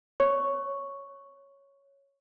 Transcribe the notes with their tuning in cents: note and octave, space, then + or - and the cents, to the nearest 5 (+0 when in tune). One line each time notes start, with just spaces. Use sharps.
C#5 +0 C#6 +0